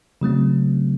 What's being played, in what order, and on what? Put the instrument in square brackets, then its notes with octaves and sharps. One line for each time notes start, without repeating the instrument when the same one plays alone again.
[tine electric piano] C#3 F#3 A3 C4